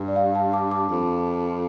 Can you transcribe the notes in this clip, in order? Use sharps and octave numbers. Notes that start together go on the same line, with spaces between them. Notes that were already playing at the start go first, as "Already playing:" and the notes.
Already playing: G2
D5
F5
F5 A5
A5 D6
A5 D6
F2